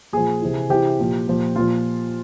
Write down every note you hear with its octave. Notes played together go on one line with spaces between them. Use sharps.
A#2 F3 G#4
C3 E3
C3 E3 G4
A#2 F3
A#2 F3
A#2 F3 F4